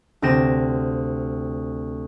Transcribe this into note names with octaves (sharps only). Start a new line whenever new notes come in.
D2 C3 C4 A#6 E7